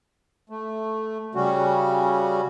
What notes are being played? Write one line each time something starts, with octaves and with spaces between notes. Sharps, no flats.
A3
C#3 G3 C#4 F#4